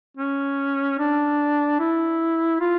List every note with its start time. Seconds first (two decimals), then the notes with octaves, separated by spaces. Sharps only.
0.17 C#4
0.99 D4
1.79 E4
2.60 F4